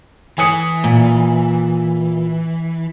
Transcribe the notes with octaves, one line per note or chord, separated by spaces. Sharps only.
E3 G#5 D#6 C#7
A#2